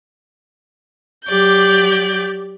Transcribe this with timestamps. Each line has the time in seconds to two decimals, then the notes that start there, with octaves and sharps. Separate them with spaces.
1.27 F#3 G4 D5 G6